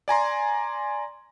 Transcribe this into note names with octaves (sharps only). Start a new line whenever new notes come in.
D5 G#5 A#5 C6